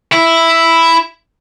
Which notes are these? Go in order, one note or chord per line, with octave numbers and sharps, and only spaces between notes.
E4